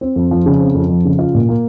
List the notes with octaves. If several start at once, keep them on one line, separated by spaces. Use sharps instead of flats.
C4
F2
F3
C#3
C4
F2
F3
C#3
F4
A#2
A#3